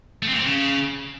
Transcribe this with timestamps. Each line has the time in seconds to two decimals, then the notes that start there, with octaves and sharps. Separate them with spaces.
0.23 A3
0.28 C4
0.33 A#2
0.38 C4
0.44 C#3